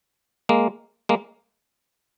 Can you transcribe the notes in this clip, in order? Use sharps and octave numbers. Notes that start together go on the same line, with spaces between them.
G#3 A#3
G#3 A#3